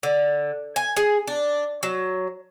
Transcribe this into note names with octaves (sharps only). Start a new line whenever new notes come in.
D3
G#5
G#4
D4
F#3